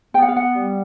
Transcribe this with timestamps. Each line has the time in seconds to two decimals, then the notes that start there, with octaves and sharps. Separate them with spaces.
0.14 B3 G5
0.22 F#5
0.28 F5
0.36 F#5
0.55 G3